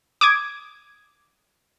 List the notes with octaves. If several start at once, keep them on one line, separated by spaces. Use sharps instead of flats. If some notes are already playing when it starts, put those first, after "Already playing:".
D6 D#6 G#6